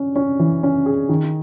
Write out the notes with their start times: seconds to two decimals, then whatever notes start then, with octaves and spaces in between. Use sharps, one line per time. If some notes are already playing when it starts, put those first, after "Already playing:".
Already playing: C#4
0.16 C#4
0.39 E3
0.63 C#4
0.86 G#4
1.09 D#3